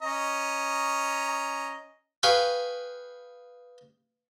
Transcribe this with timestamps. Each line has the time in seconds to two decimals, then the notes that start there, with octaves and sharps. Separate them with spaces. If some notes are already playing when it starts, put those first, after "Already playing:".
0.02 C#4 D#5 A#5
2.23 G#4 B4 F5 G5 C#6